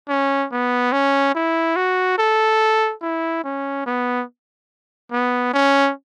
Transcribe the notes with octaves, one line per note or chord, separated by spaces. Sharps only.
C#4
B3
C#4
E4
F#4
A4
E4
C#4
B3
B3
C#4